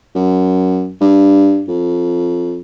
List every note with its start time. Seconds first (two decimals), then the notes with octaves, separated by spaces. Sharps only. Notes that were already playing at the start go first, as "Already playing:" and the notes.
0.15 F#2
1.01 G2
1.68 F2